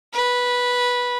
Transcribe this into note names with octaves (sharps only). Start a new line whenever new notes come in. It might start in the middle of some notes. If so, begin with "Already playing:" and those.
B4